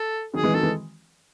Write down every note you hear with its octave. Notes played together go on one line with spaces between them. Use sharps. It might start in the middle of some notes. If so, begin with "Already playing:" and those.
Already playing: A4
D#3 F#3 G#4
E3 G#3
D#3 F#3 A4
E3 G#3